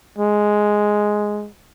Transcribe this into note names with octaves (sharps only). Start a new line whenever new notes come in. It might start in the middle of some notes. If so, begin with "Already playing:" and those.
G#3